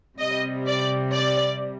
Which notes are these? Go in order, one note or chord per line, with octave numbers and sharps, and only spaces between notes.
C3 G3 D#5
D5
D5